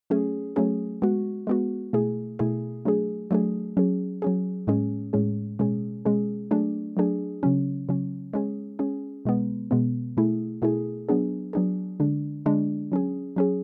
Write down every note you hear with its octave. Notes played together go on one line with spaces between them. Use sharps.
F#3 A3 C#4 G#4
F#3 A3 C#4 G#4
G#3 B3 F#4
G#3 B3 F#4
B2 A3 E4 G#4
B2 A3 E4 G#4
F#3 A3 D4 G#4
F#3 A3 D4 G#4
F#3 C#4 G#4
F#3 C#4 G#4
A2 G#3 C#4 G#4
A2 G#3 C#4 G#4
B2 G#3 C#4 G#4
B2 G#3 C#4 G#4
F#3 A3 D4 G#4
F#3 A3 D4 G#4
C#3 F#3 C#4
C#3 F#3 C#4
G#3 C#4 G#4
G#3 C#4 G#4
B2 G#3 B3
B2 G#3 B3
B2 A3 E4 G#4
B2 A3 E4 G#4
F#3 B3 D4 G#4
F#3 B3 D4 G#4
D3 G#3 D4
D3 G#3 D4
F#3 C#4 G#4
F#3 C#4 G#4